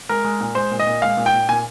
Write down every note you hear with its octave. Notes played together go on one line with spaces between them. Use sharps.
G#3 A#4
G#3
A#2
G#3 C5
A#2
D#5
A#2
G#3 F5
A#2
G5
A#2
A#2 G#5